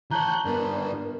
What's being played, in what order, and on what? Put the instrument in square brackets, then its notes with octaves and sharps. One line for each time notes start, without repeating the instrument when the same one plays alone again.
[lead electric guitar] E3 C#5 [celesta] A5 A#5 [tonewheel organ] F#6 G6
[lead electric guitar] G2 B3 [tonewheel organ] D4 [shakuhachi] A#4